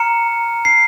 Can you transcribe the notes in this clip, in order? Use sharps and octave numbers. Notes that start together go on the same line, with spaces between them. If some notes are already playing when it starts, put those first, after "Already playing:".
Already playing: A#5 F6 C#7
C7